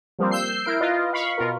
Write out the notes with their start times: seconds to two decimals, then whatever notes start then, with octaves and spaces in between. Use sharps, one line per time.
0.19 F3 G3 A#3 C4
0.31 E6 G6 C7
0.65 E4 A#4 D7
0.81 F4 B4 D#5
1.13 F5 B5 C#6
1.38 B2 F4 A#4